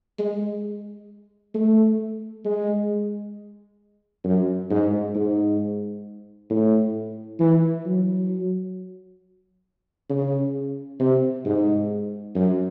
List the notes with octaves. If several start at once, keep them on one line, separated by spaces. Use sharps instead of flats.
G#3
A3
G#3
F#2
G#2
G#2
A2
E3
F#3
C#3
C3
G#2
F#2